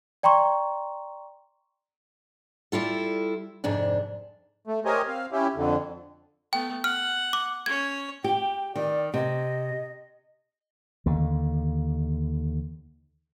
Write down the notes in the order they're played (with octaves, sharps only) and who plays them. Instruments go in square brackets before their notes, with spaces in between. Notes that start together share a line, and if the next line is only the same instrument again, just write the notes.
[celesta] D5 G5 A#5 C6 C#6
[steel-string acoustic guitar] G3 E4 F4 A4
F2 G#2 C3 D4
[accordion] A3
G4 A#4 C5 C#5 D#5 G#5
C4 F5
C#4 E4 G4
F2 D3
[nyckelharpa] A3 B3 [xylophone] G5
[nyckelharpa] F#5 [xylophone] F6
[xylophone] D6
[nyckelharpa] C#4 C#5 [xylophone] G#6
[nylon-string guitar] G4 [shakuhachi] G5
[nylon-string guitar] D#3 [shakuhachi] D5
[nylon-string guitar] C3 [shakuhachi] D#5
[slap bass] D#2 D3